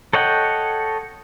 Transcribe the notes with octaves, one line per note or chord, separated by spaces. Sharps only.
A4 C#5 D#5 F#5 G5